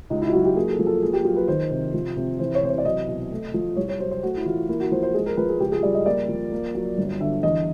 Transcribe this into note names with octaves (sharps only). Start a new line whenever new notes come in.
C#2 D#4
E4
F4
F#3 F#4
G4
A#3 G#4
A4
F3
A4
A#3 G#4
G4
F#3 F4
B4
D#3 C5
C3
F3
C3
E3 C5
C#5
C3 C5
C#5
D5
F#3 D#5
B2
A3
F3
C2 C#5
C#5
F#3 C5
C5
A3 F#4
E4
E3 F4
A#3 E4
F#4
F3 C5
C5
G#3 G#4
A#4
F3 B4
G#4
C#2 G4
G#4
G3 D5
D#5
A#3 D5
F3
A#3
F#3
G1
D3 E5
E2 D#5